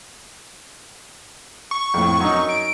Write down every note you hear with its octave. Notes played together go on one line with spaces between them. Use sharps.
C#6
F2 A2
F#2 D#4
D7